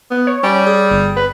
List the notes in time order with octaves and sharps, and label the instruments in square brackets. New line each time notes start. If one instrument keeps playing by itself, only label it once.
[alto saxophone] B3
[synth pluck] C#5
[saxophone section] G3 [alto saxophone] C#4
[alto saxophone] G#4
[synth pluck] G1
[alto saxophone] B4